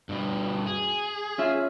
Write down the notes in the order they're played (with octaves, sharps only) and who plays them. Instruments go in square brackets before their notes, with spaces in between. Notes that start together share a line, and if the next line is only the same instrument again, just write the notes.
[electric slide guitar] G2 B2
G#4
[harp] C#4 F4 E5